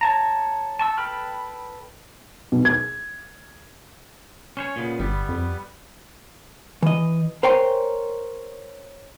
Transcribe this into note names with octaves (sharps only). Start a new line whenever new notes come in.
C#5 A5 A#5
A5 C#6 E6
A4 B4 G5 B5 F6
B2
G#6
C#4 C5 C#5
A#2 C#3 B3
G1 G3 B3
F2
E3 D#5
A#4 C5 C#5 G5 G#5 C6